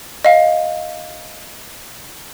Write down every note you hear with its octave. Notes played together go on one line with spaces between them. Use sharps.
D#5 F5